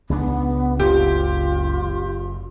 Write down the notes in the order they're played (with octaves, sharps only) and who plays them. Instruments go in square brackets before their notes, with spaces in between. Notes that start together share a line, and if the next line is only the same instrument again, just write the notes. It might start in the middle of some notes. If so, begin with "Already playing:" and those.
[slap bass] C#2 C#3 D4 [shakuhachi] B3
[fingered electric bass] F#1 [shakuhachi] F4 [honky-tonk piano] G4